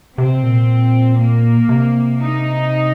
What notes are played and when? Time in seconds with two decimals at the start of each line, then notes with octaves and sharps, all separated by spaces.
0.18 C3 C4
0.43 A#2
1.19 A#3
1.69 C3
2.20 D#4